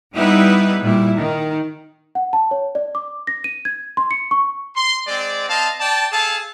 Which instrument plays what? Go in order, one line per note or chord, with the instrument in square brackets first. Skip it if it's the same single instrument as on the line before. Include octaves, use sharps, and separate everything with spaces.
[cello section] G3 B3 D#4 E4 B4
A#2 G3 E4
D#3
[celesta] F#5
A5
C#5
D5
D6
A#6
D#7
G#6
C6
C#7
C#6
[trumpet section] C6
G#3 C4 D5
C4 D#5 F5 A5
D5 G5 A5
G#4 A4 F5 A5